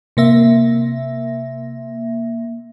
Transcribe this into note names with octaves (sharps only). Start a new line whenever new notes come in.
C3 A#3 E5